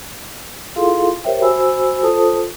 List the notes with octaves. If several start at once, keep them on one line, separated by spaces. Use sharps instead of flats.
E4 F4 G#4 A4 F5 C6
G4 A#4 C5 C#5 E5 G5
F#4 C5 G#5 B5 E6
F4 A4 C5 A5 D#6